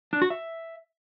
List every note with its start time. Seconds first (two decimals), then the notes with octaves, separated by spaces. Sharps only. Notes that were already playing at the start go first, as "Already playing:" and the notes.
0.13 D4
0.22 F#4
0.30 E5